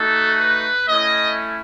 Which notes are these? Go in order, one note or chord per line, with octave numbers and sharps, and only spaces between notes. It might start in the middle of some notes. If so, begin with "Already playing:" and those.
Already playing: A3 D#4 F#4 A4
B4
A3 C#4 E4 D#5